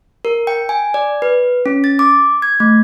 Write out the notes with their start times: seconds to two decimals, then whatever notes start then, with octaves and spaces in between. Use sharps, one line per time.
0.25 A#4
0.47 G5
0.69 G#5
0.94 D5
1.22 B4
1.66 C#4
1.84 A6
1.99 D6
2.42 G#6
2.60 A3